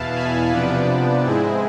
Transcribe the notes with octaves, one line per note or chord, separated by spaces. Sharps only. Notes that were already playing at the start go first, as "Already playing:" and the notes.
Already playing: E2 B2 B3 E4 F5 A5
G#5 B5
C3 F3 B3 D4 B4 D5
G#2 G#3 C4 E4 G#4